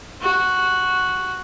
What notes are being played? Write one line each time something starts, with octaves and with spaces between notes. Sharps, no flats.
F#4